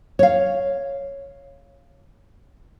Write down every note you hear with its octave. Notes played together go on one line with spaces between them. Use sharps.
C#5 F5